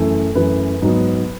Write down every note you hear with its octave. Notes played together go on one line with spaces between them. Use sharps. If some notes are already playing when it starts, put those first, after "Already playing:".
Already playing: F#2 E3 A3
F#2 E3 A3 B4
G#2 F#3 B3